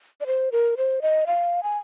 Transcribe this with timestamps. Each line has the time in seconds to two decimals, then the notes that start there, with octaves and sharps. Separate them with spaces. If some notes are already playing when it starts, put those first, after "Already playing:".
0.21 D5
0.27 C5
0.52 A#4
0.77 C5
1.02 D#5
1.27 F5
1.63 G#5